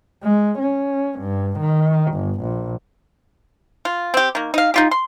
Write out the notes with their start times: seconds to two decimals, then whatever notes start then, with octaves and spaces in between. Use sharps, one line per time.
0.23 G#3
0.59 C#4
1.20 G2
1.59 D#3
2.12 G1
2.42 A#1
3.85 F4
4.14 C4 G4
4.35 D#3 A#3
4.54 D#4 F5
4.74 D#4 F4 G4
4.91 C6